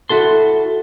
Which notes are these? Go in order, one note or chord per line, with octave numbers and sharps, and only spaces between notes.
E4 F#4 A4 C6